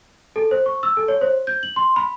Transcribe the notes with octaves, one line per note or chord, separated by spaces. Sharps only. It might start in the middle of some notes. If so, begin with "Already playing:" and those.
A4
C5
C#6
E6
A4
C#5
C5
G6
F#7
C6
B5